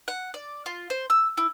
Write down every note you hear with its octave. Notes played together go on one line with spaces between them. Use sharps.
F#5
D5
F4
C5
E6
E4